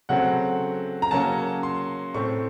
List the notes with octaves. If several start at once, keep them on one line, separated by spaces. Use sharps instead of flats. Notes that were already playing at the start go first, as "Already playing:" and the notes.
C#3 F#3 A3 C4 F#5
A#5
C#3 F#3 A#3 C#4 A5
C6
A2 A3 C4 C#6